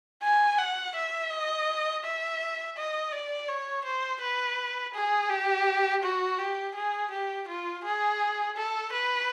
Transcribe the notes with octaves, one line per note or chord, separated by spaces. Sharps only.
G#5
F#5
E5
D#5
E5
D#5
D5
C#5
C5
B4
G#4
G4
F#4
G4
G#4
G4
F4
G#4
A4
B4